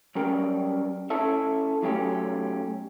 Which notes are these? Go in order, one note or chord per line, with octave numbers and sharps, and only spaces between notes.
F#3 G3 C#4 A#4 G5
C#4 E4 A4 E5
B1 F#3 A3 C#4 G4